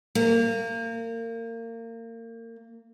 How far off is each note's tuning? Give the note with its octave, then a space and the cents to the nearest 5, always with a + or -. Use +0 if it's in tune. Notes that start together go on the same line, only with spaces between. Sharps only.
A#3 -30